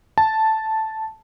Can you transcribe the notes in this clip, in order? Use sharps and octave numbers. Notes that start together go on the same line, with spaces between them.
A5